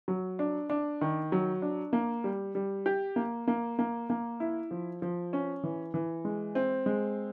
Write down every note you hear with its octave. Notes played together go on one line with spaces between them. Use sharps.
F#3
D4
D4
D#3
F#3
D4
A#3
G3
G3
G4
A#3
A#3
A#3
A#3
E4
F3
F3
C#4
E3
E3
G#3
C4
G#3